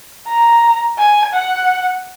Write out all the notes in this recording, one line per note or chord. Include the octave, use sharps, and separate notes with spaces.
A#5
G#5
F#5